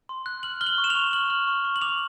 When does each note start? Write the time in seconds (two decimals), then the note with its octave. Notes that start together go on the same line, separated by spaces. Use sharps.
0.09 C6
0.26 F#6
0.43 F6 F#7
0.61 F6 G7
0.66 F#7
0.78 C#6
0.84 E7
0.90 F7
0.95 C#6
1.13 F6 F#7
1.30 F6
1.47 C#6
1.65 C#6
1.76 F#7
1.81 D6 F7